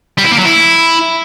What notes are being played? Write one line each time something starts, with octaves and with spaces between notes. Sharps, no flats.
G3
E4
A#3
F#3
E4